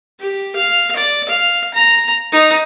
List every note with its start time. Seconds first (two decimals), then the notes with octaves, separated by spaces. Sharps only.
0.20 G4
0.56 F5
0.96 D5
1.29 F5
1.74 A#5
2.32 D#4